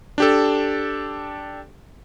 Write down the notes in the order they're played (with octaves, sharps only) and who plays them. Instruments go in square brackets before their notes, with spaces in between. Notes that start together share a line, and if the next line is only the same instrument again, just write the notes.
[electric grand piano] D4 G4 A4